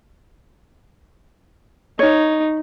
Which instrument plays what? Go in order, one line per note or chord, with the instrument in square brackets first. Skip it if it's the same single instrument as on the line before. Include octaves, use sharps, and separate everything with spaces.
[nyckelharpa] D#4 [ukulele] C#5